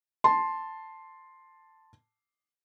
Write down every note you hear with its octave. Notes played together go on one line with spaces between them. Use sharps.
A5 C6